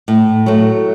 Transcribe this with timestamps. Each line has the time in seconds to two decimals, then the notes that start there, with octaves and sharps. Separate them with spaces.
0.08 A2
0.46 F#3 A3